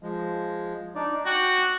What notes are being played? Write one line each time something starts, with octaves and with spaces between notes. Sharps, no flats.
F3 G#3
D4 D#4 D5
F#4 G5 D6